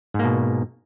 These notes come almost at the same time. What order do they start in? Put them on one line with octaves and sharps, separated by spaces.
G#2 A#3 B2